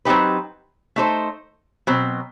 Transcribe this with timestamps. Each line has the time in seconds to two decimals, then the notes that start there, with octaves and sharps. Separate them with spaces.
0.05 F#3 C4 D#4 G4 B4
0.96 A3 D#4 A4 C5
1.87 B2 F#3 C4